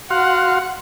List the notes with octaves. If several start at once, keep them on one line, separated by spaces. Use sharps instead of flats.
F#4 F5 F#5 C6